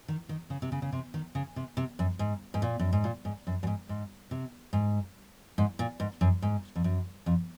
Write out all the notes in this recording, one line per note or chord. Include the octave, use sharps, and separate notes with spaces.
D#3
D#3
C#3
C3
C#3
C#3
C3
D#3
C#3
C3
C3
F#2
G#2
G#2
A#2
F#2
G#2
A#2
G#2
F#2
F#2
G#2
G#2
C3
G#2
G#2
A#2
G#2
F#2
G#2
F2
F#2
F2